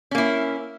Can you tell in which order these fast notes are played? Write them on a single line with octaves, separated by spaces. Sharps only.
C#4 A#3 E4